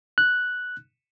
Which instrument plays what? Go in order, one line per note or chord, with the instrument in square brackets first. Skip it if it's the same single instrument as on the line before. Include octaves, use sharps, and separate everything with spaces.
[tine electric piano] F#6